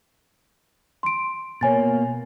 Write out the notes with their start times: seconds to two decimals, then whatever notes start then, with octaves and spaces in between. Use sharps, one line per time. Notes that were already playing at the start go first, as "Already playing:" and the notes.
1.03 C6 D7
1.61 B2 A#3 C#5 G#5 A6